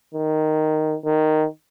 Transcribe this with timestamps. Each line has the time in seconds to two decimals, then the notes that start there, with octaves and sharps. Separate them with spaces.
0.14 D#3
1.05 D#3